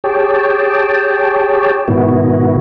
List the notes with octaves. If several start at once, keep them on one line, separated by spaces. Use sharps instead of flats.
G4 G#4 C#5 G5 A5
G#2 B2 D#3 B3 E4 F#4